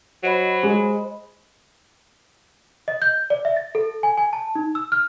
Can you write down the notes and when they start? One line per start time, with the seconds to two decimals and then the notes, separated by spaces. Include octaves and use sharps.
0.24 F#3 C5 D#5 B5
0.63 G#3
2.88 D#5
3.02 G6
3.30 D5
3.45 E5
3.57 A6
3.75 A4
4.03 G#5
4.18 G#5
4.33 A5
4.55 D#4
4.75 E6
4.92 F6